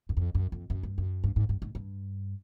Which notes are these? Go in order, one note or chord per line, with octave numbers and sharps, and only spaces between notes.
F#2
F2
F#2
F2
F#2
G2
F#2
G2
G#2
G2
G#2
G2